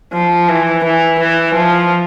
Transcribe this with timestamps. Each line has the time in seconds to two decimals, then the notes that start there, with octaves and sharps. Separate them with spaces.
0.13 F3
0.49 E3
0.84 E3
1.20 E3
1.55 F3